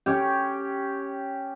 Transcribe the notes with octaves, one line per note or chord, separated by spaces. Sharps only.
C#4 G4